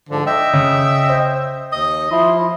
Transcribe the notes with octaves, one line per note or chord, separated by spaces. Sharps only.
G#2 D3 F3
D#5 E5 G5
C#3
C5
D#2 D#5
F3 E4 C6